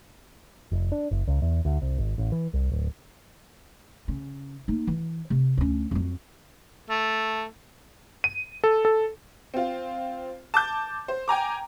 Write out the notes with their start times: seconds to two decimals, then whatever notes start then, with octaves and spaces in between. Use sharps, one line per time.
0.72 F1
0.92 D4
1.11 F#1
1.27 C#2
1.42 E2
1.65 D2
1.82 C2
1.98 G#1
2.18 A1
2.32 E3
2.53 C2
2.71 D1
4.08 C#3
4.68 A#3 D#4
4.87 E3
5.30 C3
5.57 D2 C#4
5.91 F2 F#3
6.90 A3
8.24 D#7
8.64 A4
8.85 A4
9.54 C4 F4
10.54 A5 D6 G6
11.08 C5
11.28 G5 G#5 A#5 D6